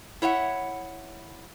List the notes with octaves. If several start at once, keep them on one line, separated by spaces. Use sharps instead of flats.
E4 C#5 E5 F#5